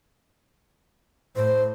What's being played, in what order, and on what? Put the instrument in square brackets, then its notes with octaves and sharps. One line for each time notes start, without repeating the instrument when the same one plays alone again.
[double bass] A2 [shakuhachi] C5